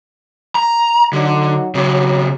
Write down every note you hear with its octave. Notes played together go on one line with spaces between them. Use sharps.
A#5
D3 F#3 D#4 F#4
C#3 F#3 C4